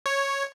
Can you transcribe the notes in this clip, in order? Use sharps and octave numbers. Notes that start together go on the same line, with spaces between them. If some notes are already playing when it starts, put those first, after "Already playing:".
C#5